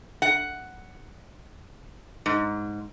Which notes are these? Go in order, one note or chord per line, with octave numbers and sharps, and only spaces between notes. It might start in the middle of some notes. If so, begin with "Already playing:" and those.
F#5
G#2